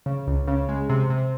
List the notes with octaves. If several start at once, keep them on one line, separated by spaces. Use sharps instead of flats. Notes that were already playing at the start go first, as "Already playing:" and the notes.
C#3
C#2
C#3
G#3
C3
C3